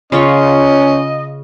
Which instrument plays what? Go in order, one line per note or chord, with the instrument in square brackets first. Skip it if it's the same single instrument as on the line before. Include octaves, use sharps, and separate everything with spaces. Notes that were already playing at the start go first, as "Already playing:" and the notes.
[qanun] C#3 F4 C#5 [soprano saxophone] C#4 [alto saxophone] D#5